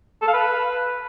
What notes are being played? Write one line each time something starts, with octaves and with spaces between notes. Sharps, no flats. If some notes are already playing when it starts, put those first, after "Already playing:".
A4
F5
B4